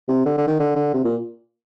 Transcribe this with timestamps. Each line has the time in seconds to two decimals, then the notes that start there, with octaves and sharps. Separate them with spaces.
0.08 C3
0.25 D3
0.37 D3
0.47 D#3
0.59 D3
0.76 D3
0.94 C3
1.04 A#2